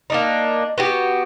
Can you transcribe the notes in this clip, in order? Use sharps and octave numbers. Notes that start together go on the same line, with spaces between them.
A#3 D4 D#4
B3 F#4 G4